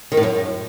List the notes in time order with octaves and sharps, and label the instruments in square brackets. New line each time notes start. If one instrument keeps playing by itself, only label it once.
[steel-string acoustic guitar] D#3
A2
F#2